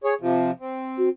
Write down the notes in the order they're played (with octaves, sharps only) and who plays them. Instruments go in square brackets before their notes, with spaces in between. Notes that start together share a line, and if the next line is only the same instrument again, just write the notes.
[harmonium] G#4 C#5
C3 F3
C4
[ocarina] F#4